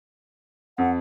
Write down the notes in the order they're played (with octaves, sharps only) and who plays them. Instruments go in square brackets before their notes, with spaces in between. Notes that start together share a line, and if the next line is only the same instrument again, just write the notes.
[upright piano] F2 [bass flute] F#5